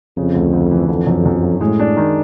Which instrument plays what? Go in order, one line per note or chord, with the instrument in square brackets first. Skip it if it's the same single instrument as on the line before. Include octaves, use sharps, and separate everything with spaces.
[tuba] F2 [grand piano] C#3
[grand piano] D2
D2
E3
[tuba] F2 [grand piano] D3
[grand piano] F#2
F#2
F#3
[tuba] A2 [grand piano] G#3
[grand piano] D4
D#3